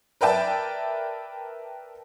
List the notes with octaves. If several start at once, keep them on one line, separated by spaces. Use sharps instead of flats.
A#4 B4 D5 E5 G5 A5